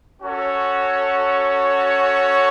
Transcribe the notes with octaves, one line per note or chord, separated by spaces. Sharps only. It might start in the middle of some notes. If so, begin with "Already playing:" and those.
C#4 F#4 A4 C#5